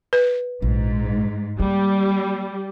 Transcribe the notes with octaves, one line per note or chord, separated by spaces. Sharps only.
B4
A#1 G#2
G3 A#3